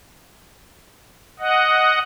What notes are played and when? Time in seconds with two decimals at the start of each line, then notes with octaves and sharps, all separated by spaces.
1.39 D#5 F#5